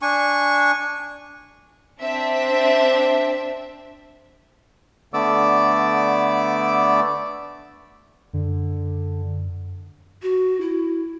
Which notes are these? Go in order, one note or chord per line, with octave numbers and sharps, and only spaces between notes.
D4 G#5 C#6
C4 D4 E5
D3 A3 B3 D5 D6 E6
F#2 D3
F#4
E4